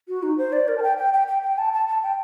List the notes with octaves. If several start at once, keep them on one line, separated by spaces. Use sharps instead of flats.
F#4
D#4
C5
D5
A#4
A5
G5
G5
G5
G5
G5
A5
A5
A5
G5